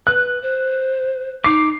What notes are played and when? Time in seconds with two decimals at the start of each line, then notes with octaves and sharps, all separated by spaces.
0.07 B4 F#6
0.42 C5
1.44 D#4 D6 C7